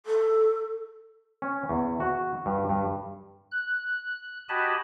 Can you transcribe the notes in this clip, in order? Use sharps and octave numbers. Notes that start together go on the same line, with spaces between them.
A4
C#4
E2
F#4
G2
G2
F#6
F#4 G4 D#5 G#5 A5 B5